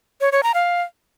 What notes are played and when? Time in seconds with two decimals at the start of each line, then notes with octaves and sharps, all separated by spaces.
0.21 C#5
0.32 C#5
0.43 A#5
0.54 F5